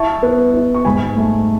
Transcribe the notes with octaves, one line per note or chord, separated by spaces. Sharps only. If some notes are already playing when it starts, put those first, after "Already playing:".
Already playing: E4 A5 C#6
B3
E4
C#6
G#2 G#5 B5
A3